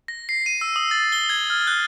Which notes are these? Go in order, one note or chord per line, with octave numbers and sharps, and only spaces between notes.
A#6
C7
D#7
E6
D#6
A6
G7
G#6
F6
F#6